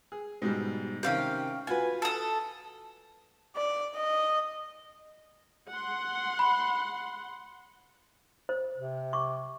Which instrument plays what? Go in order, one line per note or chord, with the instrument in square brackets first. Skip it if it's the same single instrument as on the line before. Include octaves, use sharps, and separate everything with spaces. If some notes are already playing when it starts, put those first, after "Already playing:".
[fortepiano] G#4
G#2 B2 G3
[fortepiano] C3 D#3 [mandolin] C#4 F5 G5
[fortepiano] F4 F#4 B4 [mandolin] G#5
[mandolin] A4 D#6
[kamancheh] D5
D#5
[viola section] F#5 C6
[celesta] B5
[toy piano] C5
[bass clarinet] C3
[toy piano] C#6 D6